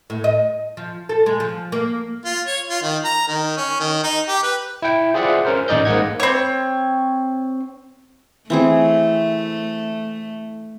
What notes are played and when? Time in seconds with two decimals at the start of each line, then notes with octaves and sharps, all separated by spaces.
0.10 A2
0.24 D#5
0.77 F3
1.09 A4
1.26 G#3
1.40 F3
1.72 A#3
2.25 F4
2.47 C#5
2.69 F4
2.82 D#3
3.05 A#5
3.28 D#3
3.57 C#4
3.80 D#3
4.04 D#4
4.28 G4
4.43 B4
4.82 E4 G5
5.14 F4 G#4 C5 D5 E5 F#5
5.45 C#4 A#4 C5
5.68 A1 D#4 D5 D#5 G6
5.85 G#2 A#3 D#5 F#5 G#6
6.20 C4 C#5
8.50 E3 A3 C4 G#4